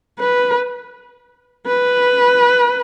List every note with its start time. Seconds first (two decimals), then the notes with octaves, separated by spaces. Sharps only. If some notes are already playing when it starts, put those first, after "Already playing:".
0.19 B4
1.67 B4